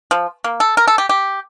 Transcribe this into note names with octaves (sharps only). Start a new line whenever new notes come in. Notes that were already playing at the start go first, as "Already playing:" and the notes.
F3
A#3
A4
A#4
A4
G4
G4